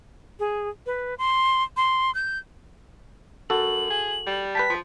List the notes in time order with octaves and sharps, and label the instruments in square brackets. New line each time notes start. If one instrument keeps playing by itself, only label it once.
[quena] G#4
B4
C6
C6
G6
[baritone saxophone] F#2 [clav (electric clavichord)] F#4 A4 [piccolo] F#7
[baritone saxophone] G#4
G3
[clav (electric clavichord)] B4 G5 A5 [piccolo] B6
[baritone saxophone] F3